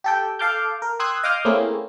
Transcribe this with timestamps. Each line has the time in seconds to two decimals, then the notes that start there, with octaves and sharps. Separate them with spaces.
0.04 G4 A4 G5
0.39 A4 F5 A5 D6 F6 G6
0.82 A#4
0.99 G5 C6 D#6 E6 F#6 G#6
1.23 D#5 F5 D6 D#6 F6 G6
1.45 A3 A#3 C4 C#4 E4 G#4